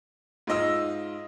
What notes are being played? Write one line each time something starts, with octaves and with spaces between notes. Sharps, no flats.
G#2 F4 D#5 E6